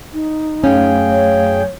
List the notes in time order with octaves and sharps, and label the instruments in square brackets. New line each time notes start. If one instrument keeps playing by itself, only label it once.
[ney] D#4
[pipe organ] F#2 G#4 G5 [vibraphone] A3 F5 [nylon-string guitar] C#4
[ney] C#5